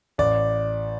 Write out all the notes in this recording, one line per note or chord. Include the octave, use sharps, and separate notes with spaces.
A1 D5